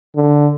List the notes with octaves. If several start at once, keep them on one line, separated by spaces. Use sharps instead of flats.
D3